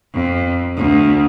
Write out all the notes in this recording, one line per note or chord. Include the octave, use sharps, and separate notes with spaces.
F2
D2